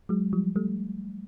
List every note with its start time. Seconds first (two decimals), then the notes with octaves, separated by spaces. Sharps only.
0.09 F#3 G#3
0.33 F3 G3
0.56 G3 A3